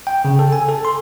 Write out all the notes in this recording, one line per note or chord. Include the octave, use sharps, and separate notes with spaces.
G5
C#3
A4
G#5
A4
C6